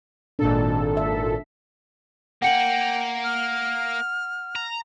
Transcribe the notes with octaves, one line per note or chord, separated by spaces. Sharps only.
G#1 A#2 D4 A4
E5
A#3 F#5 G5 C#7 F#7
F6
A#5